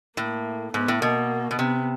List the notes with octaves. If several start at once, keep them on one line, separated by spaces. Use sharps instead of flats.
A2 A#3
G#2 B3
A2
B2 A#3
B2
C3 B3